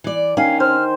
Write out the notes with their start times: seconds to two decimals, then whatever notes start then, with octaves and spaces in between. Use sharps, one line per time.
0.04 E3 D5
0.37 D#3 C#4 F5 G#5
0.60 C5 F6